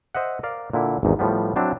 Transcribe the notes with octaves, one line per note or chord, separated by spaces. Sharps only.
C5 D#5 E5 F#5
A#4 D5 F5
A#2 D3 E4
G#1 E2 D#4
A2 F3 G3 B3
F#3 C4 D4 E4